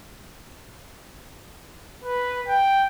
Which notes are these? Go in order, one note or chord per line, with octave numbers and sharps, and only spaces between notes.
B4
G5